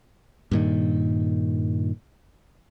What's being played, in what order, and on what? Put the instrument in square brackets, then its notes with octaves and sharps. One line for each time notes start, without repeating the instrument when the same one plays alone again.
[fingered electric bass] G2 A#2 D#3